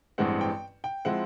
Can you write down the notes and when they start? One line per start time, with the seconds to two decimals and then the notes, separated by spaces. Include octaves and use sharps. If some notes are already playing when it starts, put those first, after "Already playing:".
0.18 A1 G2 E3 G#3 C4 F#5
0.41 G5
0.84 G5
1.05 F3 G#3 C4 E4 F#5